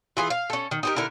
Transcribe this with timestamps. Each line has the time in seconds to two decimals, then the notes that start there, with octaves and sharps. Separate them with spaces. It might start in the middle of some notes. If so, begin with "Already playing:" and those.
0.17 E3 F4 G#4
0.30 F5
0.50 C#4 A4
0.71 D#3
0.83 D#4 G4 A#4
0.96 D3 E4 A#4